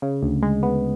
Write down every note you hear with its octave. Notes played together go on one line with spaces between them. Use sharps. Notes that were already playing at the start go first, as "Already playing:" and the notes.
C#3
D2
G#3
B3